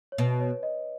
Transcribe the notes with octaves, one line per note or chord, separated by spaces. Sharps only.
C#5
B2 B4
C#5
D#5